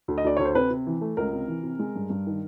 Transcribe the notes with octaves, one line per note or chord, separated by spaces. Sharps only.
D2
D#5
D2 D5
D2 C#5
C5
C3 B4
C3
E3
A3
C#2 A#4
C3
E3
C3
G#3
G2
G2
D#3